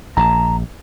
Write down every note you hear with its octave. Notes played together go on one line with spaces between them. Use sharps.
A#1 A5 A#5